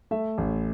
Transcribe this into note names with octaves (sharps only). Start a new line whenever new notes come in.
A3 E5
A1